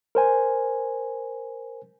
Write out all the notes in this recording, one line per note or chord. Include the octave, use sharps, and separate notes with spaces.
A#4 C5 G#5